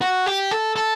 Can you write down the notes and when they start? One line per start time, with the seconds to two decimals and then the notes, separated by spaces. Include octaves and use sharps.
0.01 F#4
0.26 G4
0.51 A4
0.76 A4